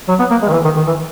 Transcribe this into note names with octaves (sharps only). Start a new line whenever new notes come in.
F#3
B3
A#3
G#3
D#3
E3
D#3
D#3
E3